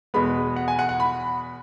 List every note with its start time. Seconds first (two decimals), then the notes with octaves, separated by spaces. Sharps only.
0.14 E2 B2 G#3 B3 B5
0.56 F#5
0.68 G#5
0.79 F#5
0.89 F#5
1.00 B5